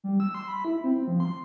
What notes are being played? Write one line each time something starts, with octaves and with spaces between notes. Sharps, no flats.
G3
E6
C6
B5
E4
C4
F3
C6